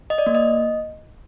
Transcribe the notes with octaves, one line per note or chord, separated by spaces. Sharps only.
D#5
D5
A#3
D#5